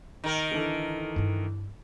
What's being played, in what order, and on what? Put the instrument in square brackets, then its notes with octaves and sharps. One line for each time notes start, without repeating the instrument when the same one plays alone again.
[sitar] D#3 A#4
[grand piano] D3 E3 A4
[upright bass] G2 E4